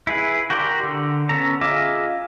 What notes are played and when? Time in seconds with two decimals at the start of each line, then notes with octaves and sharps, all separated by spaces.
0.07 E4 G#4 B4
0.50 F#4 G4 A#4 D5 C6
0.83 D3
1.29 B3 C#4 A4 A#5
1.61 F4 G#4 D#5 E5 D6